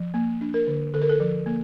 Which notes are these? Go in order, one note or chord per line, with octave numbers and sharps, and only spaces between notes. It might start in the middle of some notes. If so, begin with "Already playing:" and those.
Already playing: F3
A#3
D4
A#4
D3
D3 A4
A#4
A4
F3
A#3